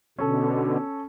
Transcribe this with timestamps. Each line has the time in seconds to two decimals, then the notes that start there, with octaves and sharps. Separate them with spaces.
0.18 B2 D3 C#4 A4